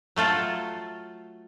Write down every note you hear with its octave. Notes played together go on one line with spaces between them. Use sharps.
F#3 A3 F4 A4